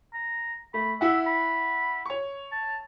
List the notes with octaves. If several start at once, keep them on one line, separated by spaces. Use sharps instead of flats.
A#5
A3 B5
E4 E5 F#5
B5
C#5 C#6
A5